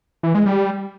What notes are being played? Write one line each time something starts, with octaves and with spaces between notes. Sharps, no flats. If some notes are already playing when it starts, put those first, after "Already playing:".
E3
G#3
G3